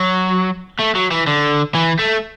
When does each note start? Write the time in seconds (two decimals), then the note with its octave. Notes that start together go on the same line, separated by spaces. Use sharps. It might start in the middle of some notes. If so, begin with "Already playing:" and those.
Already playing: F#3
0.79 A3
0.95 F#3
1.11 E3
1.27 D3
1.75 E3
1.99 A3